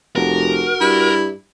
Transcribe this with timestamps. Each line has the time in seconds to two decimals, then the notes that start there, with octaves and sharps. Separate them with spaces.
0.16 F1 F#4 A#4
0.81 G2 E4